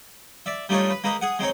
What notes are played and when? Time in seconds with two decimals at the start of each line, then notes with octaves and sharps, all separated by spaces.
0.46 D5 E5
0.69 G3 A3 D4 D#4 F4 C#5
0.90 B4
1.04 G#3 A#3 D#4 B4
1.21 G#4 F#5
1.39 G#3 C4 D#4 C#5